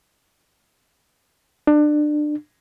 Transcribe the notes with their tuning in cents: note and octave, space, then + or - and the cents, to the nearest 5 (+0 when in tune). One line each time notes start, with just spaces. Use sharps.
D4 +25